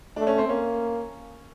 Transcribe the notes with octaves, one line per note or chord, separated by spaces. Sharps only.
A3 D4
C#4
C4
A#3 C#4